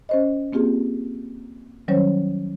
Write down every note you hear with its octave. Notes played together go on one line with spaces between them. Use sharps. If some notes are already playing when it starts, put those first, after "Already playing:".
C#4 C5 D#5
A#3 C4 F4 G4 G#4
D#3 F#3 G3 C#4 C5 C#5